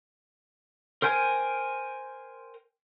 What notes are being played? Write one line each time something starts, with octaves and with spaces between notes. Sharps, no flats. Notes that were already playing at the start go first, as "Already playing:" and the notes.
A#4 C5 G5 G#5